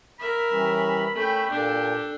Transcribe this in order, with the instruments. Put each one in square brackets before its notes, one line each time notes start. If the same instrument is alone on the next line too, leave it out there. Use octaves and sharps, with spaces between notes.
[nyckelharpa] A#4 E5 [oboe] B5
[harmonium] E3 G3 C#4
[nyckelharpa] A3 G5 [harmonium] C#4
[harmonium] A#2 [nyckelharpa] D4 A4 [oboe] G4